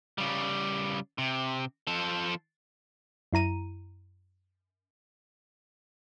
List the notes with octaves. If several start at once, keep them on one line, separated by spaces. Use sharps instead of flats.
C#3 G3
C3
F3 A4
F#2 E4 A#5 D#7